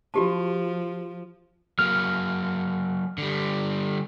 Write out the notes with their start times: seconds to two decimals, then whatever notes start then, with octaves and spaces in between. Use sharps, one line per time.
0.14 F3 F#4 G4 A5
1.79 F#3 A#3 F6
3.18 D3 G3